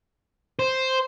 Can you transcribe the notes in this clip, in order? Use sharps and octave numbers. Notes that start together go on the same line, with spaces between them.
C5